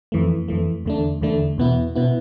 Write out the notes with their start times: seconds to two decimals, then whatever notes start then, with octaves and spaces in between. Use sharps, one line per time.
0.12 F2 E3 A3
0.48 F2 E3 A3
0.85 E2 D3 A3 D4
1.21 E2 D3 A3 D4
1.58 E2 B2 B3 E4
1.95 B2 B3 E4